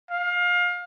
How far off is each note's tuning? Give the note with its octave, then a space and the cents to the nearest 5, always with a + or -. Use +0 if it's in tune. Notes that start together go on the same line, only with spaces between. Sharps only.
F5 +25